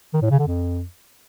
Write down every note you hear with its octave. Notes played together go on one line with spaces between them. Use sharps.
D#3
A2
C#3
D3
F2